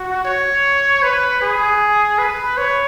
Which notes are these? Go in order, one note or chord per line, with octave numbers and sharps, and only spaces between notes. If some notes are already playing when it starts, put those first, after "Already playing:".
Already playing: F#4
C#5
B4
G#4
B4
C#5